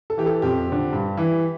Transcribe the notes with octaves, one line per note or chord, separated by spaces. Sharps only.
A4
E3 G4
A4
F2 G4
D3 F3
G2
E3